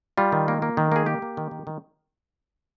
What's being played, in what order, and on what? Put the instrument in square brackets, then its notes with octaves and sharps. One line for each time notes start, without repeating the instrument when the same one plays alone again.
[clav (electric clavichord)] G3 F4
D#3
A#3
A#3
D#3
A#3 G#4
A#3 G4
A#3
D#3
D#3
D#3